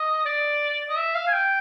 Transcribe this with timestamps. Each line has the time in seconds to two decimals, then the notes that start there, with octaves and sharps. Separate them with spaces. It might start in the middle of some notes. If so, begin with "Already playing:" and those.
Already playing: D#5
0.26 D5
0.90 D#5
0.97 E5
1.15 F5
1.28 G#5
1.33 G5